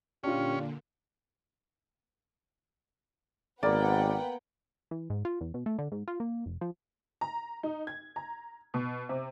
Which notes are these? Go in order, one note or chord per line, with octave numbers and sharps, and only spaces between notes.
A#2 D3 C#4 D4 F4 G4
G#1 A#3 B3 B4 D5 F#5 G5
E3
G#2
F4
E2
B2
A3
D3
G#2
F4
A#3
F1
F3
A#5
D#4
G#6
A#5
B2
C3